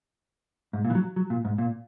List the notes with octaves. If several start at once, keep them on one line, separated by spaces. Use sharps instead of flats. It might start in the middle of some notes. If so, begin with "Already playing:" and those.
G#2
A#2
E3
F#3
F#3
A#2
G#2
A#2